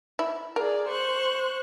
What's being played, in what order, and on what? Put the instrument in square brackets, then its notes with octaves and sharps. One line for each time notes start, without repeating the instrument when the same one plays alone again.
[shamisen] E4
[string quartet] G#4 D5 [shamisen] A#4
[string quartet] C5 C#6 F#6